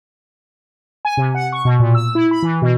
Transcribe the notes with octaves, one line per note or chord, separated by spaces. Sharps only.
G#5
C3
F#5
C#6
B2
A#2
E6
E4
B5
E3
B2